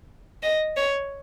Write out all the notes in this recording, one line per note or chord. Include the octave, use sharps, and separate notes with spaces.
D#5
C#5